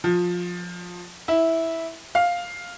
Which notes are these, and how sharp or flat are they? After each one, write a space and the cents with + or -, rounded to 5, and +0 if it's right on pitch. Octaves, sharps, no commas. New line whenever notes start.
F3 +20
E4 -10
F5 +5